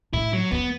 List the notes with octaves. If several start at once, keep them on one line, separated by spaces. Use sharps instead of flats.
A2 E4
F#3
E2 B3